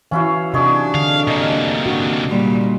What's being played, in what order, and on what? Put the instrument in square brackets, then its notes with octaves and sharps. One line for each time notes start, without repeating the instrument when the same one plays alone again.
[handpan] E3 F5 [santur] C#4 E4 F#4
[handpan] C3 F#4 [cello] D4 [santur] D#4 G#4 C#6
[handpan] D3 [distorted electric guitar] F5
[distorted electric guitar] C3 A#3 [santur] D#5
[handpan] D4 F#4
[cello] A#2 G3